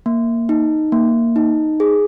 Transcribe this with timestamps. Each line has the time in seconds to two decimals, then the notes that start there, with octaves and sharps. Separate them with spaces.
0.06 A#3
0.49 D#4
0.92 A#3
1.36 D#4
1.80 G#4